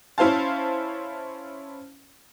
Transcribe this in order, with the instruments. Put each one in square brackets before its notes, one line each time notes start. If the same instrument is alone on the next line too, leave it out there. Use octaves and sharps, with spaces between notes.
[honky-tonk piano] C#4 E4 C5 F5 A5